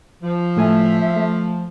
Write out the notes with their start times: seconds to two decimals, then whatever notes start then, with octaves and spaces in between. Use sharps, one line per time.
0.22 F3
0.57 A2 A3 E5 G#5
1.16 A3